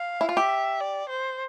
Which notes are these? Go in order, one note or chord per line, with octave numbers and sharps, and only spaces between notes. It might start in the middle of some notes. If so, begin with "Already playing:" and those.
Already playing: F5
E4
F4
G4 E5
D5
C5